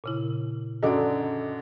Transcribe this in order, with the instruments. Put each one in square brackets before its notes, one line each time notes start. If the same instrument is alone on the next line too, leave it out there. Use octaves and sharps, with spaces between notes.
[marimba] A#2 C#3 E4
[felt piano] F#2 D3 D6 [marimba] F#4 D5 [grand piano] A4 D#5